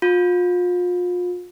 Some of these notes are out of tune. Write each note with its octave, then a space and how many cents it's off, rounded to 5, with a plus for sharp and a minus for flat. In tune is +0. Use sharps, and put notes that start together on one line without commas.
F4 +35